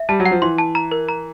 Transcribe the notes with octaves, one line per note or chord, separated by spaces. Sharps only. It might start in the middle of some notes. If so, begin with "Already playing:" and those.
Already playing: E5
G3 A5
F#3
F#5
F3
E3 C6
A5
A#5
A#4
A#5